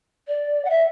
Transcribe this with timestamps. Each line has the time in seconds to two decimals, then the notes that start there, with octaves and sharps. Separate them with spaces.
0.28 D5
0.65 F#5
0.70 E5